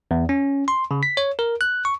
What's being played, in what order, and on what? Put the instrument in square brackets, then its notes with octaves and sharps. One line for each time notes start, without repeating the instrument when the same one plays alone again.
[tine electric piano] E2
C#4
C6
C#3
B6
C#5
A#4
F#6
C#6